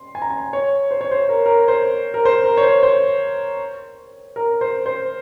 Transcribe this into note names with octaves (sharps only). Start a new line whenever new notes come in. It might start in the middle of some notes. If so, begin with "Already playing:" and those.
Already playing: C6
G#5
A#5
G#5
C#5
C5
C#5
C5
A#4
A#4
C5
A#4
C5
A#4
C#5
C5
C5
A#4
C5
C5